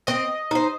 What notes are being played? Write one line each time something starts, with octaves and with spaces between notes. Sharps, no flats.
C4 D#5
D#4 C5